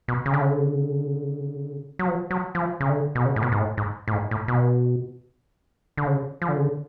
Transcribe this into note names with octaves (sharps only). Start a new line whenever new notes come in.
B2
C#3
D3
C#3
D3
C#3
D3
C#3
D3
C#3
D3
C#3
D3
C#3
D3
C#3
D3
C#3
D3
C#3
F#3
F3
F#3
F3
C#3
D3
B2
C#3
A2
B2
G#2
A2
G#2
A2
G#2
A2
B2
D3
C#3
F3
D3
C#3
D3